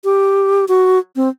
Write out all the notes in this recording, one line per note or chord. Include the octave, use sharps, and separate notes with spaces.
G4
F#4
C4